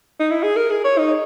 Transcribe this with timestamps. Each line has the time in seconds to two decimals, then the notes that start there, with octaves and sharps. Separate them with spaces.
0.20 D#4
0.30 E4
0.43 G#4
0.56 A#4
0.71 G#4
0.84 C#5
0.98 D#4